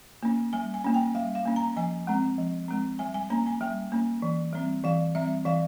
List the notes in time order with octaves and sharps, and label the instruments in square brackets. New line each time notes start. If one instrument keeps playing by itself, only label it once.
[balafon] A#3 C#4
G3 G#5
G#5
A#3 C#4
G5
G3 F5
F5
A#3 C#4
A#5
F3 G#5
G#3 C4
F3
G#3 C4
G3 G#5
G#5
A#3 C#4 A#5
G#5
G3 G5
A#3 C#4
E3
G3 C4
E3 F5
G3 C4 E5
E3 F5